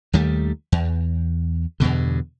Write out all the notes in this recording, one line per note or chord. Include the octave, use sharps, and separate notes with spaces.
D#2 D#3 G3 A3
E2
E2 G2 B2 D3